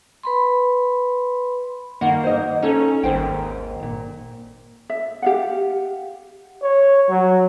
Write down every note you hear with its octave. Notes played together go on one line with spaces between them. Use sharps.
B4 B5 C6
D#3 A#3 F#5
C5 D#5
C#4 D#4 A4 C#5
G#1 D#2 C5 G5
A#2
E5
G4 F5 F#5
C#5
F#3